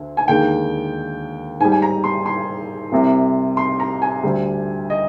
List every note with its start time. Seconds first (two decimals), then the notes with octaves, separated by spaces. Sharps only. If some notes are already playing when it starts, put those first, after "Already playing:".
Already playing: D2 D3
0.17 G#5
0.28 D#2 D3 G#3 G5
1.60 G#2 G#5
1.65 G3
1.72 G#5
1.82 A#5
2.04 C6
2.26 C6
2.92 C2 C3 G3
3.57 C6
3.80 A#5
4.02 G#5
4.23 D2 D3 G3
4.90 D#5